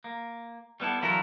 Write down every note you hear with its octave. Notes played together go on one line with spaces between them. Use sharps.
A#3
G3 B3 E4 A4
D3 E3 F#3 E4 F4 A#4